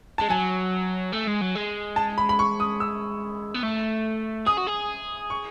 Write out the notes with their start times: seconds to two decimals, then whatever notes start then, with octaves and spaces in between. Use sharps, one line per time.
0.18 G#3 A5
0.29 F#3 G#5
1.13 A3
1.28 G#3
1.41 F#3
1.55 G#3
1.96 A5
2.18 B5
2.29 B5
2.39 C#6
2.60 D#6
2.80 E6
3.54 B3
3.63 A3
4.47 G#4 D#6
4.58 F#4
4.67 G#4
5.30 C#6